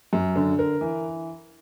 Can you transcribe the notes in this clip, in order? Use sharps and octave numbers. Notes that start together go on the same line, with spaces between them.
F#2
D3
A#4
E3